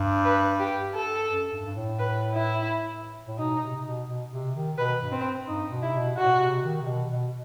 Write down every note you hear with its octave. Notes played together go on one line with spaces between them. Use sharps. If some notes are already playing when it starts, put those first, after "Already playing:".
Already playing: G2
B4
G4
A4
F#2
G2
G2
A2
B4
E4
A2
B2 D#4
C3
B2
B2
C3
D#3
B2 B4
G2
C4
G2 D#4
B2
C3 E4
B2
B2 F#4
A2
B2
C3
D#3
C3
B2
B2